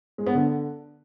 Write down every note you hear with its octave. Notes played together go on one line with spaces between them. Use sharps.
G#3
B3
D3